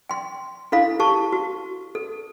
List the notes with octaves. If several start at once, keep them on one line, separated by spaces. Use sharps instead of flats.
G5 C6
D4 E4 A4 F5 B5
G4 A4 A5 C#6
F#4
A4